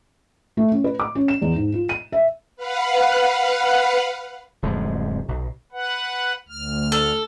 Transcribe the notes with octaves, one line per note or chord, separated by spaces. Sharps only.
A3
C#4
B4
D6
C#4
E7
E2
G#2
F4
D#7
E5
B4 F5 F#5
D1 F2 F3 G#3
B1
B4 F#5
D2 F6
A4